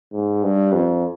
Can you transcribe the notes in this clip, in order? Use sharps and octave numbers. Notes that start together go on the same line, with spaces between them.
G#2
G2
F2